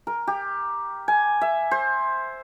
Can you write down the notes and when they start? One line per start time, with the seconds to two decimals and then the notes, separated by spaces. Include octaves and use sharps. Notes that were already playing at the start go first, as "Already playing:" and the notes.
0.07 A#4
0.27 G4
1.08 G#5
1.41 E5
1.71 C5